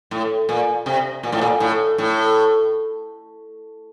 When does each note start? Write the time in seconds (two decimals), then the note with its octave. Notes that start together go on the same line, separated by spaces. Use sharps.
0.11 A2
0.49 A#2
0.86 C3
1.23 A#2
1.32 A2
1.41 A#2
1.60 A2
1.98 A2